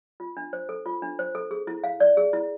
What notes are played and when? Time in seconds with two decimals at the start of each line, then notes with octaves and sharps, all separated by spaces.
0.20 F4
0.37 D4
0.53 C5
0.69 A4
0.86 F4
1.02 D4
1.19 C5
1.35 A4
1.51 G#4
1.67 E4
1.84 F5
2.00 D5
2.17 G#4
2.33 E4